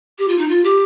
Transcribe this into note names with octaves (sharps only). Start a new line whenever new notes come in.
G4
F4
D#4
F4
G4